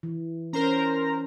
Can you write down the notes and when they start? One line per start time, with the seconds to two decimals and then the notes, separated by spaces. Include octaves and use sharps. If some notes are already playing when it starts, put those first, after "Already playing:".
0.03 E3
0.53 C#4 A#4 C5 A#5